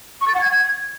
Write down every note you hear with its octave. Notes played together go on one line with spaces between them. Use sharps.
C#6
A6
F#5
G#6